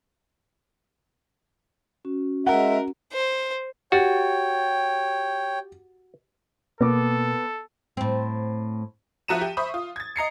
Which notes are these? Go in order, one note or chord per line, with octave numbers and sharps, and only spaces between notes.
C#4 F#4
G#3 A#4 E5 F#5
C5
F#4 G4 C#5 G5 A6
B2 A#3 B3 A4 D6
A2 C4
F3 F#4 E5 A#5 D#7 E7
G4
C5 E5 B5 C#6 D#6
F4
G#6 A6
D#5 A#5 C7 C#7